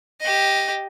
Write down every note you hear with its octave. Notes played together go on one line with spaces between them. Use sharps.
G4 D#5